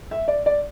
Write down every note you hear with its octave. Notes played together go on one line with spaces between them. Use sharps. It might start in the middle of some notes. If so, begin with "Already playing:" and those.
E5
D5
D5